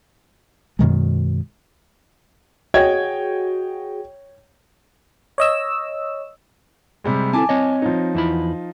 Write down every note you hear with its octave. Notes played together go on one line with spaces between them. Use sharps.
F#2 B2 D#3 G#3
F#4 G#4 C#5 D#5 G5 G#6
C#5 D#5 E6
C3 G3 G#3
C4 E4 A4 G#5 A5 D6
C4 C#5 D#5
F3 D#4
E2 E4 B5